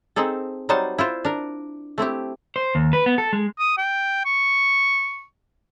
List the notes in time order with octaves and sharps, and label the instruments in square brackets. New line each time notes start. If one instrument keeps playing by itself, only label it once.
[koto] C4 D#4 G#4 A4
F#3 G3 D#4 C5 F#5 A5
E4 F4 C5
D4 A#4
A3 C4 E4 G4
[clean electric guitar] C5
D#2
B4
B3
A4
G#3
[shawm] D#6
G5
C#6